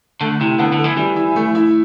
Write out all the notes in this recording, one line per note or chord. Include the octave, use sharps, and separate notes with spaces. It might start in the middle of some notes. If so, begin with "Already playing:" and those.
D3 A3
C3 E4
D3 B3
D3
A4
E3
E3 G3
E4
A3
E4